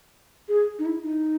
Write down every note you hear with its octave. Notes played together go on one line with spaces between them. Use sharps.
G#4
D#4
E4
D#4